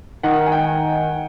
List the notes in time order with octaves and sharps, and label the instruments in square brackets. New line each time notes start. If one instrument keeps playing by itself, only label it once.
[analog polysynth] D#3 [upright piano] F#5
[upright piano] G#5
G5